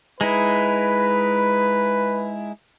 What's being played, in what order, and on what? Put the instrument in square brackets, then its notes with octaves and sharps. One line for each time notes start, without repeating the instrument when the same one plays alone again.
[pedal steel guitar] G#3 D#4 E4 [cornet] B4